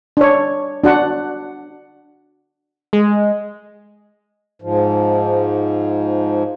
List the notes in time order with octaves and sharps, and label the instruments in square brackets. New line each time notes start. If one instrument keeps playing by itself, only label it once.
[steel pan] D4 C#5
D4 F#4 F#5
[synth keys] G#3
[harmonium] G#2 F3